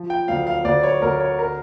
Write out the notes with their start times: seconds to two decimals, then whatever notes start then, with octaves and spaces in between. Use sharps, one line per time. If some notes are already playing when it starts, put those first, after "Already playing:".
Already playing: F3
0.10 G5
0.28 D2 F5
0.47 F5
0.65 D2 D5
0.83 C#5
1.02 D2 A#4
1.20 C#5
1.39 A#4